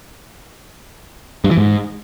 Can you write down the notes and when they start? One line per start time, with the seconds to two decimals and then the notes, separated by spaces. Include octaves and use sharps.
1.44 G2
1.51 E3
1.57 G#2